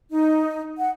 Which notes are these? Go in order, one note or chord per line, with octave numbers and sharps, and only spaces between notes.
D#4
F#5